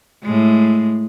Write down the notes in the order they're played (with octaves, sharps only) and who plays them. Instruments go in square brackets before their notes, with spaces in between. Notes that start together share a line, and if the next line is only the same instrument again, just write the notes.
[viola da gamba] A2 G#3